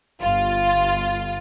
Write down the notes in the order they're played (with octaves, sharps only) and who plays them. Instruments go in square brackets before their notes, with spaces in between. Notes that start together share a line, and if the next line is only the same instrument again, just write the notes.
[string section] G1 F4